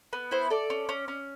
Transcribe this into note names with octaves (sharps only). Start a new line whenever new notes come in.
B3
E4 C5
A4 D5
C#4
C#4
C#4